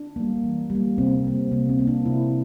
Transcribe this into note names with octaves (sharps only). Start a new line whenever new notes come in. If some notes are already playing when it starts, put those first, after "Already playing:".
Already playing: D4
G3 A#3
E3
G3
A#3
C3 C4
G3 A#3
C3 A#3
C4
G3 A#3
D4
C3 E4